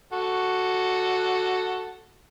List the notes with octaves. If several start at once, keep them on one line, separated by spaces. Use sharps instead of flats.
F#4 A4